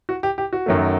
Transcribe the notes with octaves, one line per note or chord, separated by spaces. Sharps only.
F#4
G4
G4
F#4
F#2 D#3 F#3 A3